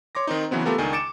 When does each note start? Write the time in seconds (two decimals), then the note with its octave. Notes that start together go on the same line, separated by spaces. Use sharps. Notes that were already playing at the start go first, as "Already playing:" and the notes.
0.15 C#5 C6 D6 A#6
0.27 D#3 C4 D#4
0.51 C#3 E3 F#3 B3 C4
0.65 A3 B3 F4 G4 A4 A#4
0.78 C#2 D#3 D4 G#5
0.93 D6 A6 C#7 D7 E7